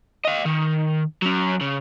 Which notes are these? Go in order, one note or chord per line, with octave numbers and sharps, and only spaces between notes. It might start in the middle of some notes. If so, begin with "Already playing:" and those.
D#5 F5
D#3
F#3 C#4
C#3